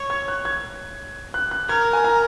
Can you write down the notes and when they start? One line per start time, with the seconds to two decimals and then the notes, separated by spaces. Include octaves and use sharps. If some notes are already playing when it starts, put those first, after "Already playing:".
Already playing: C#5
0.10 G#6
0.28 F#6
0.45 G#6
1.34 F#6
1.51 F#6
1.69 A#4 G#6
1.93 G#5
2.04 A#5